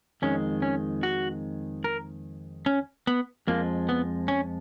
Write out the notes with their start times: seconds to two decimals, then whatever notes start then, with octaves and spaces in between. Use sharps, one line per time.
0.22 F2 D#3 G#3 C#4
0.62 C#4
1.03 F#4
1.84 A#4
2.66 C#4
3.07 B3
3.47 F2 F3 G#3 A#3
3.89 B3
4.28 C#4